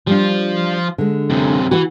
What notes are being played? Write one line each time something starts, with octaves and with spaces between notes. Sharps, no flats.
F3 G3 D4 F4
D3 G#3
F#2 C3
E3 F#4 F#5